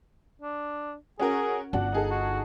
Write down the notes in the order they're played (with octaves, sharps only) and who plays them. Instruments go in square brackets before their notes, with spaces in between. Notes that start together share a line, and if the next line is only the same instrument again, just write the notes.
[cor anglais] D4
[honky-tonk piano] C#4 F#4 A#4 [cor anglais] G#4
[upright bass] G1 [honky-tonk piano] D4 F#4 [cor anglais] F#5
[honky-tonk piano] D#4 G#4 A4
[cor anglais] F#4